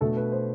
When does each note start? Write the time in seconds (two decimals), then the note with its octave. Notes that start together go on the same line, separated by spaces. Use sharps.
0.01 B2 A3 D4 A4
0.17 B4
0.32 C5